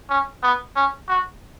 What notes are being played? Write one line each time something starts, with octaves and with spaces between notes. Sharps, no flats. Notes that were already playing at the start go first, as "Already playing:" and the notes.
C#4
B3
C#4
F#4